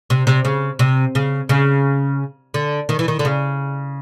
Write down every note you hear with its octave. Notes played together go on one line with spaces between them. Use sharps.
C3
C3
C#3
C3
C#3
C#3
D3
D#3
E3
D#3
D3
C#3